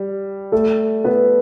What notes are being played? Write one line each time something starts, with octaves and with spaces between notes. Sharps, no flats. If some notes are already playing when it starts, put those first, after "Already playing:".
Already playing: G3
A3 A4
B3 B4